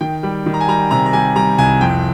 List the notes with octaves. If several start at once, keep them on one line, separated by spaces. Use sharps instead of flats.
D#3 G5
G3
D#3
A#5
G#5
G3 A#5
C3 A#5
A#5
G3 G#5
G3 A#5
C2 G#5
F2 G5